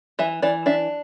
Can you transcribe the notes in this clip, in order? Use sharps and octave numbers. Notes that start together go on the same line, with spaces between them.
E3 E5
E3 D5
D4 E5